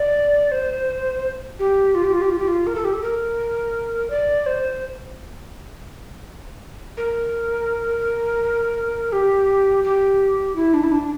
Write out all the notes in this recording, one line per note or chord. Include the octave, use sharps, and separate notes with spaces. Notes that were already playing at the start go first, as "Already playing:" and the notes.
Already playing: D5
C5
G4
F4
G4
F4
G4
F4
G4
F4
A#4
A4
G4
A4
A#4
D5
C5
A#4
G4
G4
E4
D4
E4
D4